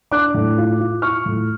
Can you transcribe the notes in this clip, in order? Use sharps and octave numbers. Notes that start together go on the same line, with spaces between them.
D4 D6 F#6
A2
F4
F4
F4 C#6 F6
A2